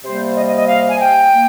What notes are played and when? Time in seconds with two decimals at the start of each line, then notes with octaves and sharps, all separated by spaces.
0.04 C3 G3 A#3 C5
0.36 D#5
0.47 D#5
0.57 D#5
0.68 F5
0.89 G#5
1.00 G5
1.32 A#3